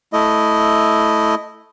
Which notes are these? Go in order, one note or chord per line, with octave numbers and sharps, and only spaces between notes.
A3 E4 D#5